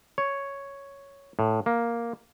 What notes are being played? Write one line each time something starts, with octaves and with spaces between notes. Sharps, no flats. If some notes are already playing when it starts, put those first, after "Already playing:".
C#5
A2
A#3